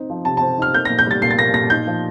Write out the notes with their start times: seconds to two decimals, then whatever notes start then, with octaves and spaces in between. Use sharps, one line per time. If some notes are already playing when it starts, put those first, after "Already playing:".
Already playing: C4 D#4
0.10 F3
0.25 C3 A5
0.37 C4 A5
0.58 D#4 F6
0.74 A#3 G6
0.85 A#2 A#6
0.99 G6
1.07 G3 A6
1.22 A#2 C7
1.31 A6
1.38 A#3 A#6
1.54 A#2 A#6
1.70 D#4 G6
1.87 F3